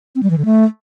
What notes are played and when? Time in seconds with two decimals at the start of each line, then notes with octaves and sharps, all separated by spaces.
0.15 C4
0.23 G3
0.30 E3
0.38 D3
0.45 A3